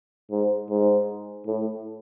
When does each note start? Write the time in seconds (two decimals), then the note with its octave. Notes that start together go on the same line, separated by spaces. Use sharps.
0.31 G#2
0.70 G#2
1.47 A2